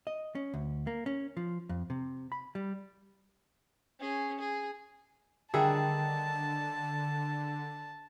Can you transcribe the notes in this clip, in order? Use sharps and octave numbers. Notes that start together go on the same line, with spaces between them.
D#5
C#4
D2
A#3
C#4
F3
F2
C3
B5
G3
C#4 G#4
G#4
D3 D#3 G3 G#4 E5 F#5 A5